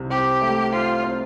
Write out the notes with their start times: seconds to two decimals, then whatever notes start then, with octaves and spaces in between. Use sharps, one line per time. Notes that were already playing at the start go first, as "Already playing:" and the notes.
Already playing: C2 C3
0.10 C4 G4
0.42 A3
0.73 C4 F4
1.04 C4